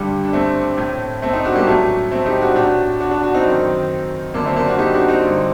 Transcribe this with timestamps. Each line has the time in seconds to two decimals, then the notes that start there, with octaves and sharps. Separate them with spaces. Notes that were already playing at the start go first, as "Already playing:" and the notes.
Already playing: G2 D3 G3
0.25 D4
0.33 A3 C4
0.77 A2
1.22 A3 C4
1.33 C4 D#4
1.44 D4 F#4
1.55 G3 A#3
1.67 A2 F#3 A3
2.11 A3 C4
2.26 D#4 G4
2.41 D4 F#4
2.56 A2 D4 F#4
3.00 D4 F#4
3.11 D4 F#4
3.23 D4 F#4
3.34 C4 D#4
3.45 F#2 D#3
4.34 F#2 D3 A#3 D4
4.45 A3 C4
4.56 A#3 D4
4.68 D4 F#4
4.78 D#4 G4
4.93 D4 F#4
5.09 C4 D#4
5.24 G2 D3